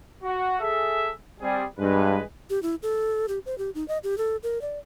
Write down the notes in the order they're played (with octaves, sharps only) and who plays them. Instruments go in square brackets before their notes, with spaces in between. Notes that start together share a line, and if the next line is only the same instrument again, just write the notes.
[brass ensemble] F#4
G#4 A4 E5
G3 C4 G#4
[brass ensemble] E2 G#3 B4 [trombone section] G2
[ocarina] G4
E4
A4
G4
C5
G4
D#4
D#5
G4
A4
A#4
D5